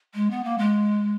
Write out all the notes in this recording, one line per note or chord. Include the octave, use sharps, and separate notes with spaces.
G#3
B3
A#3
G#3